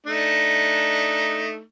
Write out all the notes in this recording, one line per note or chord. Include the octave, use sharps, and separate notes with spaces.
A3 D4 D#4